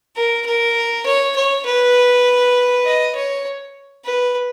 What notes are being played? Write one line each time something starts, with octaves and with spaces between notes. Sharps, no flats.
A#4
A#4
C#5
C#5
B4
D#5
C#5
B4